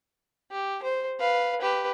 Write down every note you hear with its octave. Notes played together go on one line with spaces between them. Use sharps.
G4
C5
B4 F5
G4 B4